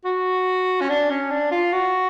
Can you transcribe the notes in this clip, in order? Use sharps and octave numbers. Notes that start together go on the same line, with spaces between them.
F#4
C#4
D4
C#4
D4
F4
F#4